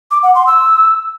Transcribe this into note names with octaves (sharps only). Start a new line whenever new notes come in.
D6
F#5
C6
E6